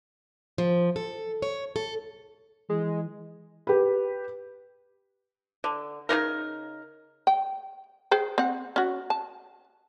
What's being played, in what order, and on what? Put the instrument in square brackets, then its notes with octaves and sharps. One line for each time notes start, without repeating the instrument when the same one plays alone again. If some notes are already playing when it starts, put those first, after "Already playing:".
[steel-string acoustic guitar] F3
A4
C#5
A4
[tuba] E3 [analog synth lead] G#3
[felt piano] G4 B4
[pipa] D3
C#3 G#3 D#4 A#4
[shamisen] G5
G#4 C5 G5
C4 F#5
C#4 F#4
A5